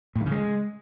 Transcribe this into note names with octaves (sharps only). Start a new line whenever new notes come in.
A2
D#3
C#3
G#3